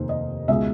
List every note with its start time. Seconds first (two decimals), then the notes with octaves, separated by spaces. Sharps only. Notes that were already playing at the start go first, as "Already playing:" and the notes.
Already playing: F1 D#2 D#3 C5
0.09 D#5
0.48 C#2 B2 G#3 E5